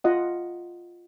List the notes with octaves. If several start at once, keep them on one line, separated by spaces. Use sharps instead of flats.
F4 D#5 F#5